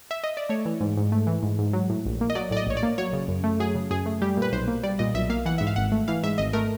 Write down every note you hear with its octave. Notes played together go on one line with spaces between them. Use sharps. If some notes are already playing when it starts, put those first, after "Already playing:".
E5
D#5
D5
A3 C#5
E3
G#2
G#2
A3
E3
G#2
G#2
F#3
A2
A#1
A#3
D#5
F#3 D5
A2 D5
D#5
A#1 C#5
D5
A#3
F#3 C#5
C#3
F#2
A3
F#3 G#4
C#3
F#2 G#4
A3
G3 G4
A#2
B4
B1 C5
A#3
G3 D5
A#2 D#5
B1 E5
A#3 F5
E3 F#5
G#2 E5
F5
G#1 F#5
A3
E3 F5
G#2 E5
G#1 D#5
A3 A#4